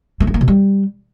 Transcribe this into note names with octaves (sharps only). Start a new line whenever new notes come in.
A3
G2
A#3
B2
G3